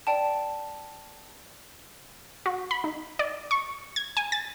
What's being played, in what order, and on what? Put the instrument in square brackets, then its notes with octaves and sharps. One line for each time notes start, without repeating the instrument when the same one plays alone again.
[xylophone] D5 G5 A5
[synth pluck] F#4
B5
D#4
D5
C#6
G#6
G#5
A6